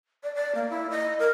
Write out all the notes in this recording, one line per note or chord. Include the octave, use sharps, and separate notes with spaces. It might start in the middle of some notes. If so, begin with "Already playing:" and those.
D5
D5
A#3
E4
D#5
A#4